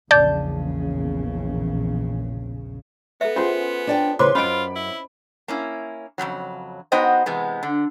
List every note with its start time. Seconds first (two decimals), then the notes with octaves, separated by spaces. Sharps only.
0.11 A#1 E2 C#3 D5 A5 G6
3.21 B3 A4 E5
3.36 C#4 F4 G#4 C5 F#5
3.87 D4 D5 G5
4.19 C#3 E3 B4 C5 C6 D6
4.35 F#2 C#4 F4 D#5 B5 D7
4.75 E4
5.48 A#3 C#4 E4
6.18 F2 G#2 C#3 F#3
6.92 B3 D#4 F#4 C5 D#5 G5
7.26 C3 E3 G#3 B3
7.63 D3